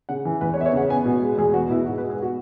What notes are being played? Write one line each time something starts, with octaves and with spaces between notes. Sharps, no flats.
C#3 F#5
E3
E2 B4
C#5
B3 E5
C#5
C#3 F#5
B3 G#5
B2
G#3
E2 G#4
B3 F#4
B2 E4
G#2 F#4
B4
G#3
G#4
B3 F#4